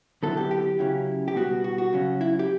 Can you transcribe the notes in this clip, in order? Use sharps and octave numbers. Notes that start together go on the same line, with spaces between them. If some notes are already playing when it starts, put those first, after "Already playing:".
D3 F#3 B3 E4 A4
G4
G4
C#3 F#3 C#4 E4
G4
B2 G3 B3 F#4
F#4
F#4
C#3 F#3 C#4
E4
G4